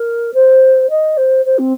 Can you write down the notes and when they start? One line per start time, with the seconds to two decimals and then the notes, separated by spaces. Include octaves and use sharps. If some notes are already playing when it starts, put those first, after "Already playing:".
Already playing: A#4
0.34 C5
0.90 D#5
1.17 C5
1.45 C5
1.58 C4